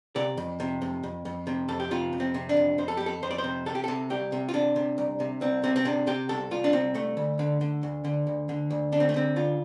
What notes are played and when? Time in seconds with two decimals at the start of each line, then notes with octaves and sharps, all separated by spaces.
0.16 C3 D5
0.37 F2
0.60 C3
0.82 F2
1.03 F2
1.25 F2
1.47 C3
1.69 F2 A4
1.80 G4
1.91 C3 F4
2.13 F2
2.20 C4
2.34 C3
2.49 D4
2.57 F2
2.78 F2 C5
2.88 A4
2.97 F2 G4
3.06 A4
3.23 F2 C5
3.31 D5
3.38 C5
3.44 C3
3.66 C3 A4
3.75 G4
3.84 C3 A4
4.10 C2 G4
4.32 C3
4.49 F4
4.54 C3 D4
4.76 C3
4.98 C2
5.20 C3
5.41 C2 C4
5.64 C3 C4
5.76 C4
5.85 C3 D4
6.07 C3 G4
6.29 C2 A4
6.51 C2 F4
6.64 D4
6.73 C2 C4
6.95 C2 A3
7.17 D2
7.39 D3
7.61 D3
7.83 D2
8.05 D3
8.27 D2
8.49 D3
8.70 D2
8.92 D3 D4
9.00 C4
9.09 A3
9.14 D3 C4
9.36 D2 F4